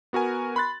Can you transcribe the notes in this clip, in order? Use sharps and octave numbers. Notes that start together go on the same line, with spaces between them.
B3 F#4 A#4 G#5
B5 C6 F#6 A6